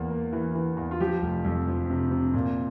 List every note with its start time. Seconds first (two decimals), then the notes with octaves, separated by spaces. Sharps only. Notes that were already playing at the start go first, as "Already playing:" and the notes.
Already playing: E2 A#3
0.10 A#3
0.33 E3
0.55 E3
0.77 E2
0.91 F4
1.00 F3 G4
1.22 F1
1.45 F2
1.67 F3
1.90 C3
2.11 C3
2.34 A#2